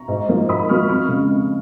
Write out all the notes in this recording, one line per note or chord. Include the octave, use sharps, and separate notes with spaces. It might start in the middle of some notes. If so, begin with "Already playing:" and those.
Already playing: A#5 C#6
G#2
F3 A#3 D#4
G#2 B5 D#6
F3 A#3 D#4 C#6 F6
F2 C#6 F6
C#3 G#3